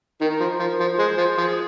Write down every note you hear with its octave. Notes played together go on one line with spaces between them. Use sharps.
D#3 A#4
F3
F3
F3
G#3 C5
F3
F3 G#4